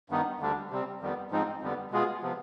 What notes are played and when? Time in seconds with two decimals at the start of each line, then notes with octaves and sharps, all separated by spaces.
0.10 G2 D#3 B3 D#4
0.40 D2 D3 G3 D4
0.70 C3 G3 C4
1.01 F2 D#3 G3 B3
1.31 G#2 F3 G#3 C4 D#4
1.61 F2 D3 G3 B3
1.91 B2 G#3 B3 F4 G#4
2.22 C3 F3 B3